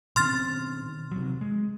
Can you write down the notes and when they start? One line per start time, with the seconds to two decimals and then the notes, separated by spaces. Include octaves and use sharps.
0.16 B2 D#3 C4 C6 F6 A6
1.12 C3 F#3
1.41 G#3